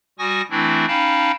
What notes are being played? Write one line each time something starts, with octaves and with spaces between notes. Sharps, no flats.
G3 F#4 G#5 C#6 D#6 A#6
E3 A3 C4 D4 E4
C#4 D#4 F5 G5 A5 B5